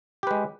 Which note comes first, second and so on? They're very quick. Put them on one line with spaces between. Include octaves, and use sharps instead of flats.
G4 B4 G#3